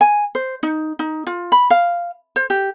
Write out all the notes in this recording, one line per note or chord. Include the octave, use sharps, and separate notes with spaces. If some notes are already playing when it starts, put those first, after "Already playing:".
G#5
C5
D#4
D#4
F4
B5
F5
C5
G4